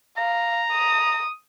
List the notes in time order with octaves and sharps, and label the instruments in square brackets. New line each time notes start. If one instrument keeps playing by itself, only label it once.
[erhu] F5 [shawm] A#5
[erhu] D#6